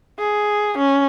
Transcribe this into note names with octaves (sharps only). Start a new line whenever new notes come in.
G#4
C#4